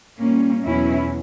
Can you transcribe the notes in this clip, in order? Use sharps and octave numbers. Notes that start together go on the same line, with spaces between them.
A#2 G3 A#3 C#4
E2 B2 F#3 C#4 E4